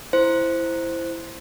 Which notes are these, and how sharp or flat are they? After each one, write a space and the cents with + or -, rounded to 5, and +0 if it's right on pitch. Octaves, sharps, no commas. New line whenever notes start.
E4 +10 C5 +0